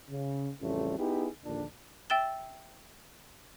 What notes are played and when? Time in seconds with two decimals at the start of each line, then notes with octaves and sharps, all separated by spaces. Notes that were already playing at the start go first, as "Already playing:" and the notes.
0.10 C#3
0.61 A1 F2 C#3 G3 A3
0.98 B3 D#4 E4 G4 G#4
1.45 A#1 D#2 A#2 D3 D4
2.10 E5 G5 E6 A6 E7 G7